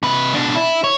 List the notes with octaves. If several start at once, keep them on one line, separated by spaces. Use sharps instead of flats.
C3 B4
B2 D4
E4
C#5